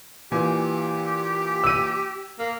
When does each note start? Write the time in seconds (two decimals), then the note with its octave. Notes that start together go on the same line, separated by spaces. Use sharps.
0.32 A#2 E3 G4 G#5
1.64 E6 D#7
2.39 A#3